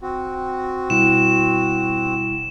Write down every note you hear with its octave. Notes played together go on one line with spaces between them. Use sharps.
C4 F#4
B2 G3 E4 E7